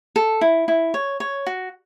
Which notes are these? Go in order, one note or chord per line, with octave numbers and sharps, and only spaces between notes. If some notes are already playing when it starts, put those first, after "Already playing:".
A4
E4
E4
C#5
C#5
F#4